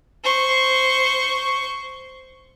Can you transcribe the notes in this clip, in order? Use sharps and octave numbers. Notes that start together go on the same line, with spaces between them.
C5 C#6